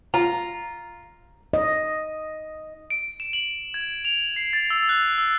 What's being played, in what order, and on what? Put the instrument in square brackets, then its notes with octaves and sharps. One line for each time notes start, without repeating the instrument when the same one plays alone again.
[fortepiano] F4 [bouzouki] A#5
[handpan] D#5
[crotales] D7
E7
F#7
G#6
F7
C7
A6
E6
F#6
E6